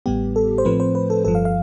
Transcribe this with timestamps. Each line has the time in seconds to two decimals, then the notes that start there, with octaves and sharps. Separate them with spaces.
0.06 A1 A2 G3 B3 G4
0.36 A4
0.58 C5
0.65 A2 F3 A3 C4 B4
0.80 C5
0.95 B4
1.10 A4
1.25 G1 G2 F3 A4
1.35 F5
1.45 F5